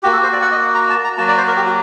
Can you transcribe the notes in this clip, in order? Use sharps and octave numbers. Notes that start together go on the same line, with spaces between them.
A#3 F#4 G4
A4
C5
D5
F#5
D#5
A#5
A5
A#5
F#3 A#3 F#4 A5
D5
C5
A#4
G4
F#4